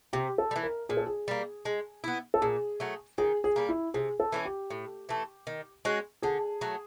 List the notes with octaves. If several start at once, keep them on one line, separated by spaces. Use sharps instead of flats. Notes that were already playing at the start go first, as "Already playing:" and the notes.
C3 G4
A4
G3
E3
A#4
A#2 G#4
A4
G#4
G3 A#3
G#3
B3 E4
A4
A#2 G#4
F#3 A3
D#3 G#4
G#4
G3 A#3
E4
C3 G#4
A4
E3 A3 C#4
G4
A2
E3 A3
D#3
G#3 C#4 F#4
D3 G#4
F#3 A3